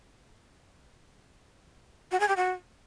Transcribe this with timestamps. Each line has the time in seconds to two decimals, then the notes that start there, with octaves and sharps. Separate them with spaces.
2.11 F#4
2.20 G#4
2.28 G4
2.37 F#4